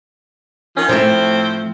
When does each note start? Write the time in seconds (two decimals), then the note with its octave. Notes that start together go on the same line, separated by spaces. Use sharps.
0.77 D#3 F3 C#4
0.89 A2 F3 A3 C4 C5